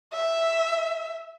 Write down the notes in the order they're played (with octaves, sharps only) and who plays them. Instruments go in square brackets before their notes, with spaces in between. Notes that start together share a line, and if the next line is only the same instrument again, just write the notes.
[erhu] E5